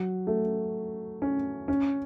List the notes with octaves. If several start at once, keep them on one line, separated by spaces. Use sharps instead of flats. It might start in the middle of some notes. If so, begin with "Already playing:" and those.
Already playing: F#3
A3
C#4
C#4